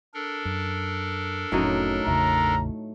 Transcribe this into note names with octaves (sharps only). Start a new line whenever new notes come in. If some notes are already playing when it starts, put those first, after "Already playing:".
D4 A4 A#4
F#2
F1 A2 F#3 C#4 D#4
A1 E2 C#3 A3 A#5